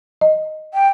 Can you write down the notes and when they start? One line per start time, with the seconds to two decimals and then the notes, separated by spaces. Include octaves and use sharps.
0.21 D#5
0.74 G5